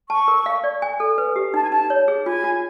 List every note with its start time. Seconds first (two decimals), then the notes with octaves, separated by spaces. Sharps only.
0.10 A5 C#6
0.28 A#4
0.46 F5
0.64 D5
0.82 G#5
1.00 A4
1.18 B4
1.36 G4
1.54 D#4 A5
1.62 G#5
1.70 D#4 A5
1.90 C#5
2.08 G#4
2.26 F4 G#5
2.44 F4